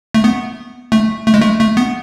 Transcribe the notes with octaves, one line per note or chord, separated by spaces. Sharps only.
A3
B3
A3
A3
G#3
A3
A3
B3